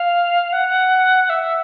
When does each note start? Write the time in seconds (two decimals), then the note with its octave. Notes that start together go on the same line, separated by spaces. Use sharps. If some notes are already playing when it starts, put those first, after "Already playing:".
Already playing: F5
0.52 F#5
1.29 E5